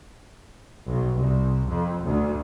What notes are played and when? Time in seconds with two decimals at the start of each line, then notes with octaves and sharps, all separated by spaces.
0.88 B1
1.19 C2
1.69 F2
2.05 D2